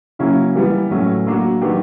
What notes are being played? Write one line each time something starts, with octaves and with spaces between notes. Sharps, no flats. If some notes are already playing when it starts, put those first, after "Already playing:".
C#3 F#3 A#3 C#4 E4
E3 G3 B3
A2 F#3 A3 C#4
F#3 A#3 D4 F#4
D#3 F#3 B3 D4 G4